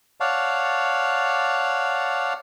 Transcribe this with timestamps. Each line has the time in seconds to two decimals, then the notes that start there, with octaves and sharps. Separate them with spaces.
0.20 C#5 D5 F5 F#5 A5